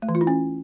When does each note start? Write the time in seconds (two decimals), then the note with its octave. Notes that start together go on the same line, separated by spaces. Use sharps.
0.02 A3
0.09 E3
0.15 F4
0.21 E4
0.27 C#4